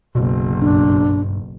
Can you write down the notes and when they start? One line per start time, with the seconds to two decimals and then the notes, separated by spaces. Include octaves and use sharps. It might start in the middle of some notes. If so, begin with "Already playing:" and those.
0.15 F#1 B1 B2
0.62 G2 D4